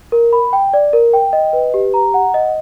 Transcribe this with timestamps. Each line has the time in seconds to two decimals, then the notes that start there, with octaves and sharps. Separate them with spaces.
0.12 A#4
0.33 B5
0.53 G5
0.73 D5
0.93 A#4
1.13 G5
1.33 D#5
1.53 B4
1.74 G4
1.94 A#5
2.14 F#5
2.34 D#5